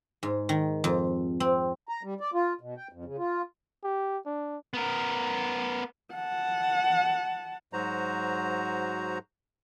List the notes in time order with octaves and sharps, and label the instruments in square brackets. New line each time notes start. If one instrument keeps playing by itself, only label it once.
[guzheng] G#2
D#3
F2
C4
[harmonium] A#5
G3
D5
F4
B2
G5
F2
C#3
F4
[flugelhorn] G4
D4
[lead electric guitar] B3 A#4
[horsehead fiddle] F#5 A5
[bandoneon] G#2 F#3 F#4 C5 A#5